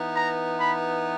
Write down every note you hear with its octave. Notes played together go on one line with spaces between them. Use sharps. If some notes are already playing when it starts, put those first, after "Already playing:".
Already playing: E3 B3 D#4
A#5
B5